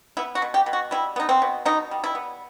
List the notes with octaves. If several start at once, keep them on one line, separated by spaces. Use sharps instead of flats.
B3 E4
F#4
B2
G4
B2
F#4
G3 E4
B3 D#4
C4
B2
B2 D#4
G3
E4
B3